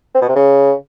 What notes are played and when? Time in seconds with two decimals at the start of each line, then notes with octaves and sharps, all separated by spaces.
0.14 C4
0.21 B2
0.29 C3
0.36 C#3